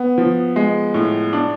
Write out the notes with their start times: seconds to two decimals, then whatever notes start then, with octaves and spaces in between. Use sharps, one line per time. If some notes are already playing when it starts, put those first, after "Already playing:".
Already playing: B3
0.18 F3
0.56 G#3
0.94 A2
1.33 D4